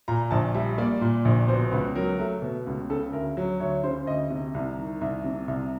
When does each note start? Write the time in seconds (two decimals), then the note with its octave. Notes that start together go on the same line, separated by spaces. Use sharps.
0.08 A#2 A#5
0.31 A#1 A5
0.54 G3 E5
0.78 A#3 D5
1.01 A#2
1.25 A#1
1.48 B2 C5
1.71 C#2 B4
1.95 F#3 A#4
2.19 A3
2.42 B2
2.67 C#2
2.90 C#3 A4
3.13 D2 A#4
3.37 F#3
3.60 D2 C#5
3.84 C#3 C5
4.07 D2 D#5
4.30 C3
4.54 C2
4.78 D#3
5.01 C2
5.24 C3
5.48 C2